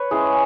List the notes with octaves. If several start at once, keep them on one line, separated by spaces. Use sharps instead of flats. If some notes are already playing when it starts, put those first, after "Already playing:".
Already playing: B4 C#5
G#3 C#4 E4 G#4